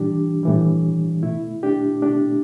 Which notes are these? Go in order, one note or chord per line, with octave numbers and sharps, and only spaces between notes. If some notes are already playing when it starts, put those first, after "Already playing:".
Already playing: A2 E3 G3 D4 G4
A2 E3 G3
B2 A3 E4
D4 G4
B2 A3 D4 G4